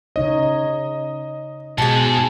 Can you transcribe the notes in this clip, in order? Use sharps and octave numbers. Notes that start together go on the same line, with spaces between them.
C#3 D#4 C#5 D#5
G#2 B2 G#4 A5